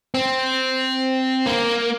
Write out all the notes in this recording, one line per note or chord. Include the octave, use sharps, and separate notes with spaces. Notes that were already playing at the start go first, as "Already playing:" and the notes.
C4
A#3